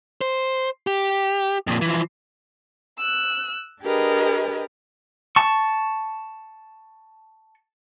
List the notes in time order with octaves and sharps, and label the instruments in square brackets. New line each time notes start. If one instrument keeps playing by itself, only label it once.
[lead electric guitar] C5
G4
F2 A#2
E3 F3
[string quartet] E6 F#6
D4 G4 G#4 A#4 B4 D#5
[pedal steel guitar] A5 C#6